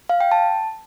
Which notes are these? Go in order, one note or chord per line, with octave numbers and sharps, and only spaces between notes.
F5
G5
A5